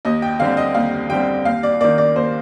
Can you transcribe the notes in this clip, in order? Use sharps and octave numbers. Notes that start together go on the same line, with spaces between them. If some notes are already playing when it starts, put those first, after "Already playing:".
D#2 D#5
G5
D3 G3 C4 F5
D#5
D#2 F5
D3 G3 C4 G5
D#2 F5
D5
D#3 A#3 D5
D5
D#2 C5